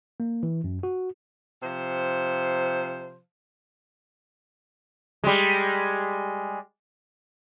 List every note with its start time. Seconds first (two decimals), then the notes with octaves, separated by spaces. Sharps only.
0.20 A#3
0.43 E3
0.64 F#2
0.83 F#4
1.61 C3 F3 C5
5.24 G3 G#3